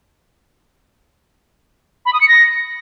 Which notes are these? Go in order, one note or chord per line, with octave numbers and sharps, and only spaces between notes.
B5
D#6
C#7
A#6